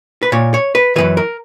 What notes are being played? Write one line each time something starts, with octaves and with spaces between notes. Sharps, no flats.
B4
A#2 C#5
C#5
B4
F#2 C#3 E3 B4
A#4